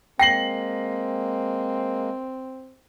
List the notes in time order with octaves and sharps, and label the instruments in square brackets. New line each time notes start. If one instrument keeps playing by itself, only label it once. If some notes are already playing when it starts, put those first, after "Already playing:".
[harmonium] G#3 A#3 [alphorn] C4 [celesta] G5 [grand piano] A#6 C7 F#7